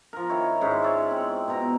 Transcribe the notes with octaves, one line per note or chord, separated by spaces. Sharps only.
F3 A#4
D#3 E4 C#5
G#2 G#3 C#4 D#4
C#5 D5 E5
C4
B2 A#5